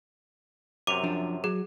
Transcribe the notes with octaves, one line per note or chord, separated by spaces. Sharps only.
F#2 C3 D6 D#7 F7
F3 D4
F#3 G#4